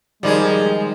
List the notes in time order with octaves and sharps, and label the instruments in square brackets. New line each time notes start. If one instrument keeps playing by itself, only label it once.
[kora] D#3 G3 [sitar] F3 G#4 [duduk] G#3